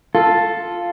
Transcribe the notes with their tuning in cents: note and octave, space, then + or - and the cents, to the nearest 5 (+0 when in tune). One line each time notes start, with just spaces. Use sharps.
F4 +0 A4 +0